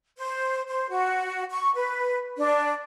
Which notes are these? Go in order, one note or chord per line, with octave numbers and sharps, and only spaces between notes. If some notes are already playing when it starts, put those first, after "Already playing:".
C5
C5
F#4
C#6
B4
D4